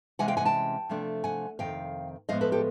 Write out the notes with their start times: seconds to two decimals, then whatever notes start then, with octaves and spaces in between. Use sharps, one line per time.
0.19 C3 E3 G#3 C#4 F#5 G#5
0.28 F5 G5
0.37 F#5 G#5
0.45 G5 A5
0.89 C3 F3 A3 D4
1.24 F#5 G#5
1.59 F2 C3 D#3 F5 G5
2.29 A2 F3 G#3 B3 D#5 F5
2.41 A4 B4
2.52 G4 A4